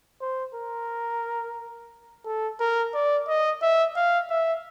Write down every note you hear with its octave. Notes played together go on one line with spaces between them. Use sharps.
C5
A#4
A4
A#4
D5
D#5
E5
F5
E5